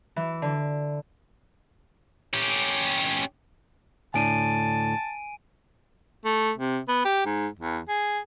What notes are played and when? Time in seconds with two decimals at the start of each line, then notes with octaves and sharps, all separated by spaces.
0.16 E3
0.42 D3
2.33 C#4 G4
4.14 D2 A2 D4 G#5 A5 D7 D#7
6.25 A3
6.58 C3
6.88 B3
7.05 G4
7.26 G#2
7.59 E2
7.89 G#4